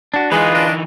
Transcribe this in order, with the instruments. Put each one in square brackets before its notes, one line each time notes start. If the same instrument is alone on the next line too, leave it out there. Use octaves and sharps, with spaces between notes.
[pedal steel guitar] D4 F#4
[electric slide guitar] E3 D#4 [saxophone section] G#3 [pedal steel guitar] F4 G#4 B4
[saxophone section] D4 D#5